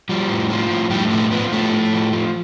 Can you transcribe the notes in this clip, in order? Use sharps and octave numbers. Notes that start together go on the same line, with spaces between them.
F3 G3
A2
F3
A2
A2 G3
F3 A3
F3 B3
A2 A3
A2
F3
F3